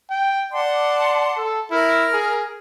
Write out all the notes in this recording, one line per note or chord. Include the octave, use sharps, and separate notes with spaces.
G5
D5 F#5 A5 C6
A4
E4 A#4 F6
G#4